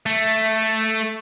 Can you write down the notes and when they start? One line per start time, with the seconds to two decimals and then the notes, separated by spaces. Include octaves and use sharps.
0.06 A3